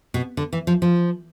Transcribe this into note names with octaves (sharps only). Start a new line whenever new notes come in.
B2
D3
E3
F3
F3